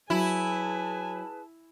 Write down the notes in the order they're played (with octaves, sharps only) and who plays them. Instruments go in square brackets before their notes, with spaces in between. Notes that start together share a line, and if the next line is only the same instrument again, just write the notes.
[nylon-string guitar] F#3 [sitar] E4 [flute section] G#4 B4 A5 [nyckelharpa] G#5